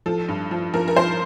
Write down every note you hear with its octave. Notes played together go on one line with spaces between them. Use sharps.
F3 A4
G2
F3
F3 A#4
A#4
F3 C5